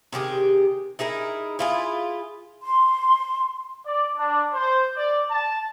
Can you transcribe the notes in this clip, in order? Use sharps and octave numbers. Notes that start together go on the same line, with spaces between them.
C3 D#3 G4 G#4
D#4 E4 G#4 A#4
E4 F4 G#4
C6
D5
D4
C5
D5
A5